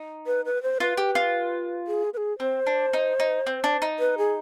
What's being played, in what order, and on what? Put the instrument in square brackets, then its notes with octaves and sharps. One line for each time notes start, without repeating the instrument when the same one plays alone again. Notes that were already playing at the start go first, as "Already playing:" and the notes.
Already playing: [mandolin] D#4
[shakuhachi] B4
B4
C5
[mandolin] F4 [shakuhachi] B4
[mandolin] G4
F4
[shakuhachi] G#4
B4
G#4
[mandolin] C4 [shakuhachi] C5
[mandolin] D4
D#4
D#4
C4
D4
D#4
[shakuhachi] B4
G#4